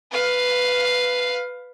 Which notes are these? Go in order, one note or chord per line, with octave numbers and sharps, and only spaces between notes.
B4 F5